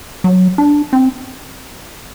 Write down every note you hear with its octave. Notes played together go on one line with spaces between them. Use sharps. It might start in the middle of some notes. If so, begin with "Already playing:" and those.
F#3
D4
C4